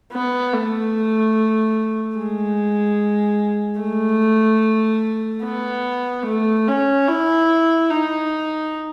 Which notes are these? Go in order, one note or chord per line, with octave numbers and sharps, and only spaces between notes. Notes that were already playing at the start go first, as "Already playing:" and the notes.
B3
A3
G#3
A3
B3
A3
C#4
E4
D#4